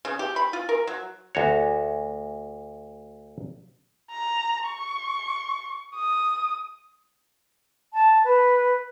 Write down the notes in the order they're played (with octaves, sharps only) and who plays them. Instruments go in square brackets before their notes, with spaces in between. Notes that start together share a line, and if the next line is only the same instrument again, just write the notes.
[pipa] C#3
G4
B5
F4
A#4
F#3
[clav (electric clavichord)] D2 F#4 C#5
[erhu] A#5
C#6
D#6
[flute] A5
B4